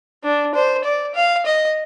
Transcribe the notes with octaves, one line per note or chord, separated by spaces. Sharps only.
D4
C5
D5
F5
D#5